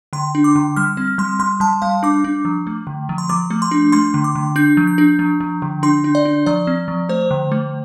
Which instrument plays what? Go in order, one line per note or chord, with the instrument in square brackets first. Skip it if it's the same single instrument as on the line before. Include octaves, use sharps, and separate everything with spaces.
[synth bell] D3 C6
D4
D6
D3
G3 F6
C4
G3 C6
G3 C6
G3 A5
G3 F5
D4 D6
D4
F3
A3
D3
F3
C6
F3 D6
A3
C6
D4
A3 C6
D3
D6
D3
D4 G6
F3
G6
D4
F3
F3
D3
D4 C6
D4
D5
D4
F3 D5
C4
F3
A3 C5
D3
A3